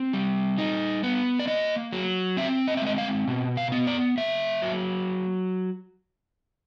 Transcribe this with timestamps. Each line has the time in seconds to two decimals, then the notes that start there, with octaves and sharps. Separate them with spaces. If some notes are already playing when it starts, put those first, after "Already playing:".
Already playing: C4
0.13 G3
0.58 D#4
1.03 B3
1.40 D5
1.47 A#3 D#5
1.93 F#3
2.37 C4 E5
2.68 D#5
2.77 E5
2.82 G#3 D#5
2.98 F5
3.28 B2
3.57 F5
3.72 B3
3.87 D5
4.17 A#3 E5
4.62 F#3